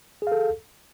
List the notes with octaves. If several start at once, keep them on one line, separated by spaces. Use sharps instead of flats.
G#4 A4 F5